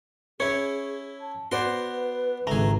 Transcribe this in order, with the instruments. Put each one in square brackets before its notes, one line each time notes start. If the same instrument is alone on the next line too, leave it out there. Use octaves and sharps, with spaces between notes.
[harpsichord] C#4 E4 [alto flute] G#4 [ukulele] C#5
[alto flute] A5
[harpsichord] B3 D5 C6 [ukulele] F#4 C5 [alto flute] B4
[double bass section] G#1 C#2 D#3 [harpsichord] A3 G#4 [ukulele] A#5